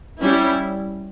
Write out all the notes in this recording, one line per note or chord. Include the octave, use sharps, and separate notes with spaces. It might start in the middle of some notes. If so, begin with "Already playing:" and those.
G3 C#4 E4